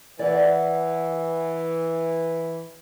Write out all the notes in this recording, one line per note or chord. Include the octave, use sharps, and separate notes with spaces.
E3 D5 F#5